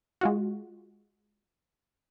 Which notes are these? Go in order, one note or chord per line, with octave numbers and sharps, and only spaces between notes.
G#3 F4 F#4